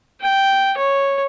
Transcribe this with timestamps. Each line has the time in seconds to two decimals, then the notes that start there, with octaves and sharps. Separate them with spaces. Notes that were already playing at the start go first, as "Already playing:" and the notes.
0.21 G5
0.77 C#5